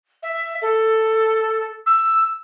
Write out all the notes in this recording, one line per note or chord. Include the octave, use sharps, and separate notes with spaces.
E5
A4
E6